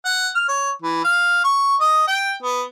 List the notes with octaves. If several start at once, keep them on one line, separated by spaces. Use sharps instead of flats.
F#5
F6
C#5
E3
F5
C#6
D#5
G5
B3